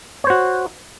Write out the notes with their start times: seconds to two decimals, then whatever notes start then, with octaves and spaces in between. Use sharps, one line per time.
0.24 C#5
0.27 C5
0.30 F#4